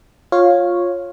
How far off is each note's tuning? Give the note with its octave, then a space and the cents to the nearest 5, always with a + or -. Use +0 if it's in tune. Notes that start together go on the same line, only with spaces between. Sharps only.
F4 +10 C#5 -10 F5 +0